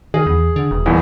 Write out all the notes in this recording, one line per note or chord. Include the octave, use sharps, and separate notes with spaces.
D#3 G#4
E2
D3
E1
D#1 E2